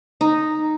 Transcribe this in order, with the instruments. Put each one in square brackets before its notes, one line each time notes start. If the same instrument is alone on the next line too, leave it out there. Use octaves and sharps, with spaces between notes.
[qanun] D#4